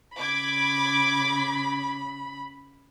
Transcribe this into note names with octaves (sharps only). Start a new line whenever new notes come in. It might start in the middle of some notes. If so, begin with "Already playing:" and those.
C#3 B5 D6 G#6 D7